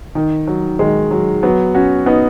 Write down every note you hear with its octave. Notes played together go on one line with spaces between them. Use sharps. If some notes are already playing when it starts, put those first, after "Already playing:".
D#3
F#3
D#3 G#3
F#3
F#3 B3
C#4 F#4
B3 D#4